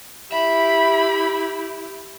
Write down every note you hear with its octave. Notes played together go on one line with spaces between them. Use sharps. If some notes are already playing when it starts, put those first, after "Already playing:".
E4 G4 E5 B5